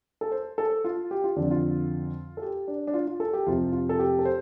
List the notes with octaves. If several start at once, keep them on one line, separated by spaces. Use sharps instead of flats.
A4
C5
A4
F4
G4
F4
F2 D3 F3 D4
F4
A4
G4
D4
D4
F4
F4
A4
G4
F2 C3 F3 F4
F4
A4
G4
A4
C5